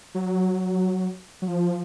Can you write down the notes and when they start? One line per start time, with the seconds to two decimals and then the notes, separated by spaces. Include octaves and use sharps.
0.15 F#3
1.42 F#3
1.48 F3